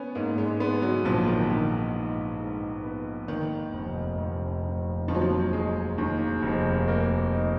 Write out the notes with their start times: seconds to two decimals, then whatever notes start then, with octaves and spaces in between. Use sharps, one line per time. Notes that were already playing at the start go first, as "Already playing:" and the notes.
Already playing: B3 C#4
0.15 G#2 A#3
0.38 G#3
0.60 G#3 B3
0.82 F#3
1.05 A#1 F3
1.28 D#3
1.50 A#1 D#3
1.95 G#2
2.39 G#2
2.84 B3
3.28 D#2 D#3
3.74 F1
4.18 F1
4.63 F1
5.08 D#2 F3
5.15 F#3
5.22 F3
5.53 G#3
5.98 D#2
6.42 F1
6.88 A#3
7.32 D#4